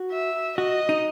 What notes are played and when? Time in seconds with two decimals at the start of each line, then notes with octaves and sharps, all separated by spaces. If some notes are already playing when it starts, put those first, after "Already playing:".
Already playing: F#4
0.12 E5
0.58 F#4 D#5
0.89 D#4